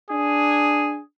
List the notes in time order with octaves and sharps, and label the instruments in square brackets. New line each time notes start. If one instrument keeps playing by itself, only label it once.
[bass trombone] D4 [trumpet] G#4